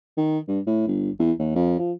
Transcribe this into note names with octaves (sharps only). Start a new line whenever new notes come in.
D#3
G2
A2
G1
E2
D#2
F2
F3